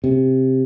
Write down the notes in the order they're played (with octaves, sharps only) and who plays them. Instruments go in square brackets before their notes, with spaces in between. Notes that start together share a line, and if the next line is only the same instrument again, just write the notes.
[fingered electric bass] C3